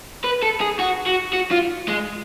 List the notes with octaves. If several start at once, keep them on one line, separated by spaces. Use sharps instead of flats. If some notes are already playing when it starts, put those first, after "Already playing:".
B4
A4
G#4
F#4
F#4
F#4
F4
G#3